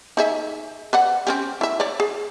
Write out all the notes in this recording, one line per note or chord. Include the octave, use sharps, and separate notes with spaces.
D#4 G#4 E5
B4 D5 F#5
C4 C#4 G4
E4 E5
C#5 D5
G#4